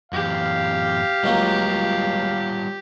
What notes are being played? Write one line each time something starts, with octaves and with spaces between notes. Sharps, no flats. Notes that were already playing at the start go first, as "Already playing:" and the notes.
F#2 E3 G4 F5
C#2 F#3 G3 A#3 F4 C#5